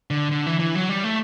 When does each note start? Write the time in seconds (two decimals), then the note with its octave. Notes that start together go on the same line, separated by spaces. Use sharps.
0.10 D3
0.32 D3
0.46 E3
0.60 E3
0.75 F#3
0.89 G3
1.04 A3